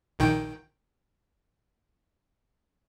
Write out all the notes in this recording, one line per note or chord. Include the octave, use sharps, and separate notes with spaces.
A#1 D#3 G5